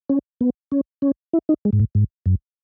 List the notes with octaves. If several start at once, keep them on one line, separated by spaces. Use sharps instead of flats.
C#4
B3
C#4
C#4
E4
D#4
G#3
G#2
A2
G#2
F#2